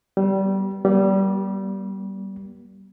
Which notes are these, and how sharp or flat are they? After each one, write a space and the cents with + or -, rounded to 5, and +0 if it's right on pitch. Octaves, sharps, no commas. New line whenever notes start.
G3 -20 B3 -20
G3 -20 A#3 +45